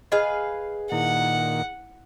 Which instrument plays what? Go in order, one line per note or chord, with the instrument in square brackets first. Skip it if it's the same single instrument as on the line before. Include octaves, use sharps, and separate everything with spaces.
[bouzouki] G#4 B4 F5 [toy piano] D#5
[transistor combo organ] A#2 D#3 [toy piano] E4 [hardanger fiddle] F#5